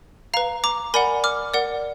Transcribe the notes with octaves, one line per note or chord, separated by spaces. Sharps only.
B4 F5 A#5
A#5 D6
A#4 D5 F#5 G#5 B5
D6 F6
A#4 D5 F#5